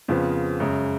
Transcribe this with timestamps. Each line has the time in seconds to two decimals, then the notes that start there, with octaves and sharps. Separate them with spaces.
0.08 F2 C#3 F3 B3
0.60 F#2 C#3 G#3